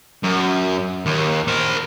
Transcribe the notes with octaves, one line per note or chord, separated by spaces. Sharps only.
F#2
D#2
A#4 C5